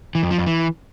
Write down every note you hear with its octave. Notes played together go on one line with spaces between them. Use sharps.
E3
F2
F3
F2
E3